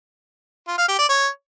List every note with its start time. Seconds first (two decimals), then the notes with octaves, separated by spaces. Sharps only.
0.68 F4
0.78 F5
0.89 G4
0.99 D5
1.09 C#5